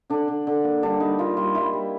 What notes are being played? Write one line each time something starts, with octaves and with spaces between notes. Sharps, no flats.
D3 D4
D3
D3
A#3
G3 D4
G3 D#4
A#3 F4
G3 F4
G3 E4
G3